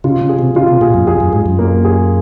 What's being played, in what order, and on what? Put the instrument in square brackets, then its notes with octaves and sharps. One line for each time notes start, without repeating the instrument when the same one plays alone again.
[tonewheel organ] C#3 [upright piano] F4
[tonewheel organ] C#3
[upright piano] G#4
[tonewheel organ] C3
[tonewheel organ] C#3 [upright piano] F4
[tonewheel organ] C3
[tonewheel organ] A#2 [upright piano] G#4
[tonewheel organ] F#2
[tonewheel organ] F2 [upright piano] G#4
[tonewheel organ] F#2
[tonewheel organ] G#2 [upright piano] G#4
[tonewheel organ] F#2
[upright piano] A#3
G#4